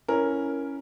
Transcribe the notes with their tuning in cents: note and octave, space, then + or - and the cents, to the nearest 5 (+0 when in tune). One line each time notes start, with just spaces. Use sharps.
C#4 +0 E4 +0 A#4 +0